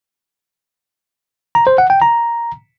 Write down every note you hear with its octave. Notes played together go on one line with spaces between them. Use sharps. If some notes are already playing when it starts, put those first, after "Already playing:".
A#5
C5
F#5
G5
A#5